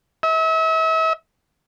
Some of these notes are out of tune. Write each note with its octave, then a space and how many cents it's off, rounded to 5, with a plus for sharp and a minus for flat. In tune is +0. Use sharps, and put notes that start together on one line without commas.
E5 -40